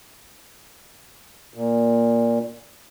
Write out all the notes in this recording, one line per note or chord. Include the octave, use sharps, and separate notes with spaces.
A#2